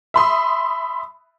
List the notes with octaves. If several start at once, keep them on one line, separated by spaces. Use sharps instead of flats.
E5 B5 C6 D#6